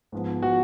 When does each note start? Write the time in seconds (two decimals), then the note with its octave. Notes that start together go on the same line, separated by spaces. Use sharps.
0.12 G#2 F3 B3
0.42 F3 B3 F#4